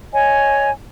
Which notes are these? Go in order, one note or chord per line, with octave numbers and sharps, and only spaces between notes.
C#5 D#5 G#5